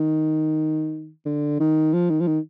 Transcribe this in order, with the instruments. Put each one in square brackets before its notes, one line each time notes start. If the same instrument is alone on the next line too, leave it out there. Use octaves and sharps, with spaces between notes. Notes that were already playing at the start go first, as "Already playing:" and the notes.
Already playing: [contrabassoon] D#3
D3
D#3
F3
D#3
F3
D#3